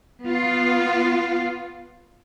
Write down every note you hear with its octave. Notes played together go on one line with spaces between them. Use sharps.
B3 F4